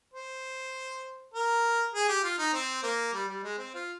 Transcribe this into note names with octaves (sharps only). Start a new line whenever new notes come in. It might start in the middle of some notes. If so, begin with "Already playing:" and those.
C5
A#4
G#4
G4
F4
D#4
C4
A#3
G3
G3
G#3
C4
F4